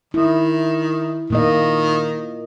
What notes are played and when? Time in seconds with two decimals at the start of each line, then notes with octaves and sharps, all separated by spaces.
0.14 D#3 E4
1.30 A#2 D#3 A#3 D#5